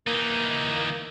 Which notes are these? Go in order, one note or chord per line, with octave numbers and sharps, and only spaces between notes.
E3 A#3 D#4